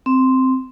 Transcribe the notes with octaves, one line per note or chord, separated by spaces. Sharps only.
C4